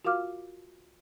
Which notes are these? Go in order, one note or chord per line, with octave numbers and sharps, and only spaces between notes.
F4 F#4 A#4 F5 D6 F6